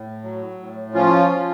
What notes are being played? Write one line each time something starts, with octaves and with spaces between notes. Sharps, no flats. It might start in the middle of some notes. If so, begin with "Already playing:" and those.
Already playing: A2
F#3
A2
F3 C#4 F4
F3